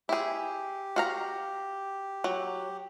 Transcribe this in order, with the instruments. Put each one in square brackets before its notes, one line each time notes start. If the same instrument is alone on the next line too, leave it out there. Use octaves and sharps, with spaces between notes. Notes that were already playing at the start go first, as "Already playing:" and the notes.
[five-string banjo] E4 G#4 [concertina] G4
[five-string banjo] F#4 F5 A#5
F#3